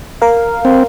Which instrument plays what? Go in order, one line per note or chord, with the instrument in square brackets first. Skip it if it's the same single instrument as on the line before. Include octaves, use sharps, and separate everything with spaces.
[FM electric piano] A#4 F5
[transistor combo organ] C4